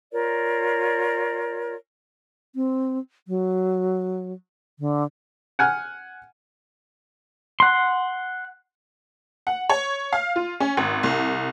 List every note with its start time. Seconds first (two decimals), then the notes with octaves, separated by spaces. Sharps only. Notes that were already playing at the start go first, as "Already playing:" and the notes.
0.11 F4 A#4 C#5 D5
2.55 C4
3.28 F#3
4.79 D3
5.59 F#5 G#5 F6
7.60 F#5 C6
9.47 F#5
9.69 C#5
10.13 F5
10.36 F4
10.60 C#4
10.77 G#1
11.03 C2